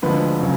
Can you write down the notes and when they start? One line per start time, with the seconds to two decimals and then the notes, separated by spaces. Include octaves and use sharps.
0.02 D2 D3 F3 G#3 B4
0.41 C#3 F#3